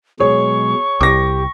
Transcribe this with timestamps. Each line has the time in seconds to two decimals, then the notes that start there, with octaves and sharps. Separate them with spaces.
0.20 B2 F#3 G#3 G#4 C#5 C#6
1.01 C2 G4 D6 A#6